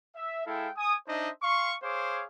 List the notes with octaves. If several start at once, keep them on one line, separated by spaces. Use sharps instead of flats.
E5
G#3 E4 A4 F5 G5
G#5 D#6
D4 D#4 C5 D#5 E5
F5 C6 C#6
G#4 C5 C#5 F5 D6